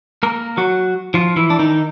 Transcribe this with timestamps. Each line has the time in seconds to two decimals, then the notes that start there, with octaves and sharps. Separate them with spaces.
0.23 A#3 A#4
0.57 F#3 F#4
1.14 F3 F4
1.36 E3 E4
1.50 D4
1.59 D#3 D#4